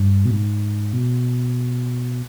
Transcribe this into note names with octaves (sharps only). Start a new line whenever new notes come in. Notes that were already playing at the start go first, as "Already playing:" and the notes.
Already playing: G2
B2
G#2
B2